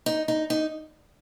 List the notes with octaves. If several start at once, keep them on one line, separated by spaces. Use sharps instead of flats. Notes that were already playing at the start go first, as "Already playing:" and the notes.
D#4
D#4
D#4